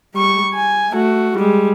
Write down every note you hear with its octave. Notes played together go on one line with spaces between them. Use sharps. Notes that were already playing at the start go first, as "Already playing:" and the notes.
G3 C#6
G#5
A3 F#4
G3 G#3